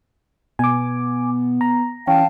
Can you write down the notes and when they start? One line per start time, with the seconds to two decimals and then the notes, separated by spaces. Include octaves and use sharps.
0.59 B2 B3 G#5 D6
1.61 A#5
2.08 E3 C#4 F5 G5 A5